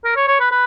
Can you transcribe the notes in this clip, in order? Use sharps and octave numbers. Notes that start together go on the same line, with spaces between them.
A#4
C#5
C#5
B4
B4